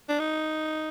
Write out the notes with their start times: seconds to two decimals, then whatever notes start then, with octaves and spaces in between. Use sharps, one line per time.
0.09 D4
0.19 D#4